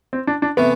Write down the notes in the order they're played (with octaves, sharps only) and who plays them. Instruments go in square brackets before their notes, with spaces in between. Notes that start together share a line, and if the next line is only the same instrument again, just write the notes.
[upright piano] C4
D4
D4
[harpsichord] C3 E3 A3 [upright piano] B3